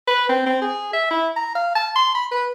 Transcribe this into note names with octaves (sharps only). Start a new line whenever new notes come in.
B4
C4
C4
G#4
E5
E4
A#5
F5
A5
C6
B5
B4